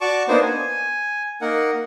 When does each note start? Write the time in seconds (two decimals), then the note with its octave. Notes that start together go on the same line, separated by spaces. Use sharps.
0.01 F#4 D5 A5 C#6 D6
0.28 A#3 B3 D4 D#4 C5
0.42 G#5
1.41 A#3 D#4 A#4 F#5